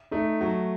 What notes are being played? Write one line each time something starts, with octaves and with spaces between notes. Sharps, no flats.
A3 D#4
F#3 F#4